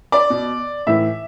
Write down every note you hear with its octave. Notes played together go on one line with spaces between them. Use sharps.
D5
B2
A2 E3 E5